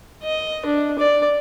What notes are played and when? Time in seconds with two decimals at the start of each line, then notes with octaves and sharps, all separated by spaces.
0.23 D#5
0.66 D4
0.99 D5